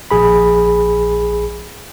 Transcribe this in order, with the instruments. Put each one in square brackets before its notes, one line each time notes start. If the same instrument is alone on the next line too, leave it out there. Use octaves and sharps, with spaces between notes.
[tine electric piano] A#1 G#4 B5